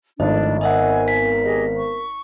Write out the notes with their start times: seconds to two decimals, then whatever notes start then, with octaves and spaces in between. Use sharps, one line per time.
0.20 G#1 A2 F3 A3 D4 D#5
0.61 B3 C4 A#4 D#5 E5 F#5 G#5
1.08 B6
1.43 G4 G#4 D#5
1.77 C#6